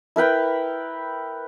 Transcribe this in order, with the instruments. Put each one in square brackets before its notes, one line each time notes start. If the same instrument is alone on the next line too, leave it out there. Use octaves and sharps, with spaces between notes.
[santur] E4 A#4 B4 G5